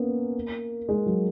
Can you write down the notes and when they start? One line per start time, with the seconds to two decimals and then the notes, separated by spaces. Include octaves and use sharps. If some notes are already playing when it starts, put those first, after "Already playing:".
Already playing: A#3 B3 C#4
0.89 G#3
1.06 F#3